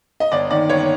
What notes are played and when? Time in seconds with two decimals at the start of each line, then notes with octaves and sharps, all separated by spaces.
0.20 D#5
0.32 G1 D5
0.50 D#3 D5
0.70 G1 C#5